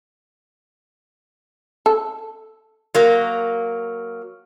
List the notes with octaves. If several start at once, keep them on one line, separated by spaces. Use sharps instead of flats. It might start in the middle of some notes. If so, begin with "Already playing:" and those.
A4
F#3 A#3